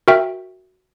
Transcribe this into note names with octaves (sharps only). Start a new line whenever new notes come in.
F#4 A#4 E5 G5